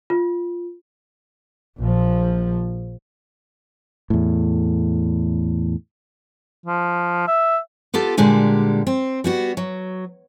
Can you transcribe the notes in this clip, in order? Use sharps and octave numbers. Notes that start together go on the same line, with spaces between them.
F4
A#1 F3
E2 A2
F3
E5
B3 F4 G4 A4
A#2 D3 G3 G#3 G4
C4
G3 B3 F#4
F#3